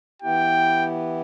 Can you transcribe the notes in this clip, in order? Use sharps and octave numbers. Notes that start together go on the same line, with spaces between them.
E3 B3 E4 G4 G5